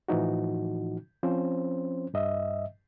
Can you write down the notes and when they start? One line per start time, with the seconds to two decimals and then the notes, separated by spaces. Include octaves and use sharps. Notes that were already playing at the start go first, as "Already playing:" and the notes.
0.08 A2 E3 F3 D#4 F#4
1.23 F3 C4 C#4 C5
2.14 G2 D#5 E5